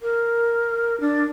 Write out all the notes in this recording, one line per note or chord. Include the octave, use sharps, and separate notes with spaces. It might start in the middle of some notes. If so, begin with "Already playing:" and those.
A#4
D4